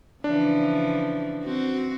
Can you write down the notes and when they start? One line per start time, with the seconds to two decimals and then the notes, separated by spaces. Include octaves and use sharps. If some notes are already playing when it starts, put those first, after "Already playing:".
0.24 C#3 E3 F3 D4
1.44 C4 F#4